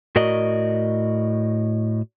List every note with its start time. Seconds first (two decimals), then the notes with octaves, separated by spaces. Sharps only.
0.16 A2 F#4 A#4 D5 D#5